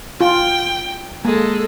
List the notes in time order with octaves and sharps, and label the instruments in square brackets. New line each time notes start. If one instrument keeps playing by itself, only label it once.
[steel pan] F4 [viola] G5
[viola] G#3 A4 [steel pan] A#3